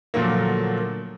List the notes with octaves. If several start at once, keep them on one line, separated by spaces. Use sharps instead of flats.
A#2 D3 F3 F#3 A3 A#3